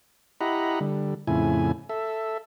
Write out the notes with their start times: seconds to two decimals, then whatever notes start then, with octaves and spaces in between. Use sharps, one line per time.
0.41 E4 G4 D#5 F#5 A#5 B5
0.81 D3 G3
1.27 F2 A2 C#3 E4 G#5
1.89 A4 E5